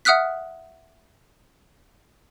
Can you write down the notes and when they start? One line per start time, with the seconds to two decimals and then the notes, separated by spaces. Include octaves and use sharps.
0.05 E5 F#5 D#6 F6 F#6 B6